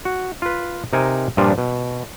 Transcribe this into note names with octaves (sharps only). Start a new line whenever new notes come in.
F#4
F4 B4
C3 D#4 A#4 D#5 G#5
G2 A#2 F3 G3 D4 F4
B2